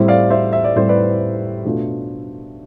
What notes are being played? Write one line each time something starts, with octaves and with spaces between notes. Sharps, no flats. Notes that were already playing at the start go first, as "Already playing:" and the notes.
Already playing: A2 G3 C4 E4
D5 F5
C5 E5
E5
D5
A2 G3 C4 E4 C5
B4 D5
B2 A3 D4 F4